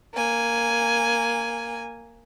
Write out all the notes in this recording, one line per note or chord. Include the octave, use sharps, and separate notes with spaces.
A#3 G#5